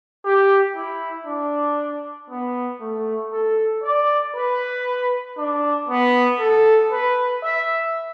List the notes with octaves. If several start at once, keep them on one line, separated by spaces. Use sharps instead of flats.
G4
E4
D4
B3
A3
A4
D5
B4
D4
B3
A4
B4
E5